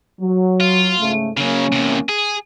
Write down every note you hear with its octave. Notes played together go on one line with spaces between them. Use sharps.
F#3
F4
G#2 C#3 A3
C#3 F#3 A#3 C#4
E2 C3
G#4